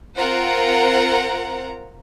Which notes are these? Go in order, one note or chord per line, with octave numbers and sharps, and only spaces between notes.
C4 F4 A#4 C5 F#5 A#5